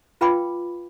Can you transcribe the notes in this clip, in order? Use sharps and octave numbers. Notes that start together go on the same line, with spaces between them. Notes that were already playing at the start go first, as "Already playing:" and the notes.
F4 B4 F5 G5 B5 D6